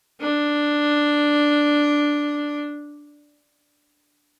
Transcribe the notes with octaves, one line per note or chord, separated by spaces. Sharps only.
D4